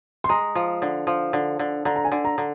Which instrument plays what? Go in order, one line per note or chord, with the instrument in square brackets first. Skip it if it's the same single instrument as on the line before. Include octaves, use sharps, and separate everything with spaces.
[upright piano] C6
[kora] G#3 [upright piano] A#5
[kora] F3
D3
F3
D3
D3
[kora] D3 [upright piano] A#5
[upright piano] A#5
G#5
[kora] D3
[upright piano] A#5
[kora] D3